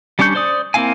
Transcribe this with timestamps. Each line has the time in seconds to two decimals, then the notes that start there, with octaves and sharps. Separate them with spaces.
0.19 G3 C#4 D4 C#6 G6
0.35 C5 D5 D#6
0.74 A#3 C4 E4 F5 G#5